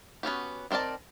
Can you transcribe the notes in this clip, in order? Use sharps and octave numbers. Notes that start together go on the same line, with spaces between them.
B3 C#4 F#4 G4
D#3 C4 A#4 D5 A5